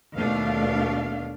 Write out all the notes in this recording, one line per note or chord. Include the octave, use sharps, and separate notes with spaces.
D#2 B2 A3 D4 F5